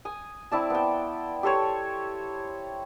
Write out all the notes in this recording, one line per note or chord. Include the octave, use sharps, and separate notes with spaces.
G#5 D#6
C4 E4 D5 A5
B3 G5
G4 A4 C5 C#5